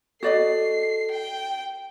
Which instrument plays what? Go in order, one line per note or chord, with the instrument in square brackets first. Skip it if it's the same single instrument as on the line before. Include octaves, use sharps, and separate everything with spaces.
[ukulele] F#4 D5 D#5 [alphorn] A4 [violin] C7
[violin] G5